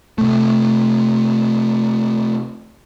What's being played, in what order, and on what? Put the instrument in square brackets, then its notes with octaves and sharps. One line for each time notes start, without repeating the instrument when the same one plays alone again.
[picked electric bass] C3 A3